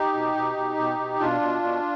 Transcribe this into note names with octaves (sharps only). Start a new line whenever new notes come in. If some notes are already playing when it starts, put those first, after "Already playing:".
Already playing: D#4 G4
B2
B2
B2
B2
B2
B2 D4 F4
B2
B2